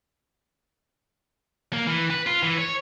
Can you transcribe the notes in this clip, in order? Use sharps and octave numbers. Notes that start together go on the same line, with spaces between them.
A#3
E3
B4
F4
E3
C#5